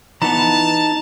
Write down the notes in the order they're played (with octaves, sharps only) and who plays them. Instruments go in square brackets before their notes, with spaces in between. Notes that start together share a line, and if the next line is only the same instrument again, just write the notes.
[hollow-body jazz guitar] E3 B3 [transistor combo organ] D#4 [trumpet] A5 [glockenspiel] A#5 F7